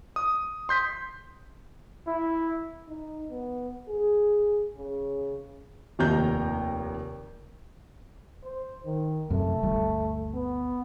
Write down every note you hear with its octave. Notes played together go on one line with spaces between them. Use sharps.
D#6
C6 G6 B6
E4
D#4
B3
G#4
C#3
F1 D#2 G5 A#5 G6
C5
D#3
F#2 C3 A3
G1 D2 G3
B3